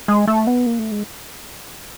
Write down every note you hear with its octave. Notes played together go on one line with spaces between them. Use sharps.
G#3
A3
B3
A#3
A3
G#3